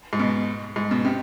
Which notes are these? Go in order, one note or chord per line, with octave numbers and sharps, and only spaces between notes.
G#2
B2
G#2
B2
C3